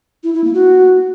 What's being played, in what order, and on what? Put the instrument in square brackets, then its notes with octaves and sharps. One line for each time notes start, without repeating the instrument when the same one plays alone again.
[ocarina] E4
E4
A#3
F#4